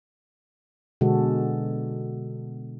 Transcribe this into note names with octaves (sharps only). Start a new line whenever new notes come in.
B2 D3 G#3 F#4 A4